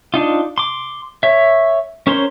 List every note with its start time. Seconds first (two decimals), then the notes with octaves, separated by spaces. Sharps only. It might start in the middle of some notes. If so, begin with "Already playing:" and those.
0.14 D4 D#4 F4
0.58 C6 D6
1.23 C#5 E5
2.07 C#4 A#4 C5 C#5 C6